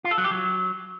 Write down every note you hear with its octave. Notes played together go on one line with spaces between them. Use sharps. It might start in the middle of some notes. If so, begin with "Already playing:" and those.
F4
A4
F#3
G4
F#3